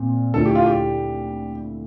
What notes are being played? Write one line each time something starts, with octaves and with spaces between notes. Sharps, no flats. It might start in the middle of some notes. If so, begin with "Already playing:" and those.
Already playing: A#2 C4
D2 D3 A3 E4 A4
G4
F4
G4